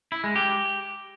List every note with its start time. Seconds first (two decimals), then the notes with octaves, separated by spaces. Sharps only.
0.12 E4
0.24 G#3
0.36 G4